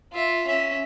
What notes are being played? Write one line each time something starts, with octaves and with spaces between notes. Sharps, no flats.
F4 E5
C#4 E5